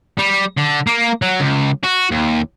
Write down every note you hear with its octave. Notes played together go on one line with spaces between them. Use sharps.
G3
D3
A#3
F#3
C#2
F#4
D#2